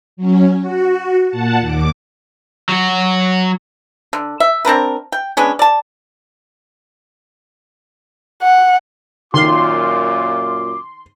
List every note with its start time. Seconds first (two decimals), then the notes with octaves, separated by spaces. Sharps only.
0.17 F#3 C#4
0.60 F#4
1.30 A#2 F#5 A5
1.60 D#2 D6
2.69 F#3 F#4
4.13 D3
4.40 E5
4.65 C4 D4 A#4 B4
5.12 G5
5.37 G#3 B3 C#4 D4
5.59 D5 A5
8.43 F#5
9.34 F#2 A#2 D#3 F4 C6 D6 F6